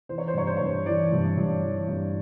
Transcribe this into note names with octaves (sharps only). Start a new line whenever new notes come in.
E3 C5
C#5
C5
G2 C#5
C5
G2 C#5
C5
E3 D5
G2
G2
E3
G2